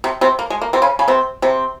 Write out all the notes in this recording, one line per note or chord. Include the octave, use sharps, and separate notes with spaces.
C3 C4
C3 C4
A#3
G#3
A#3
C3 C4
C#3 C#4
C#3 C#4
C3 C4
C3 C4